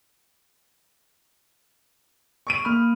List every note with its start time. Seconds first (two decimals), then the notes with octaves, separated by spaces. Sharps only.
2.47 C#6 D7 D#7
2.65 A#3 B5 F6